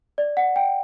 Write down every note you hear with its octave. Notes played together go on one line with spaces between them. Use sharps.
D5
F#5
G5